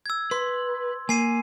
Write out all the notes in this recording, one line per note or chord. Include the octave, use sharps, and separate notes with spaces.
E6 G#6
B4 C6
A#3 G#5 C7 D#7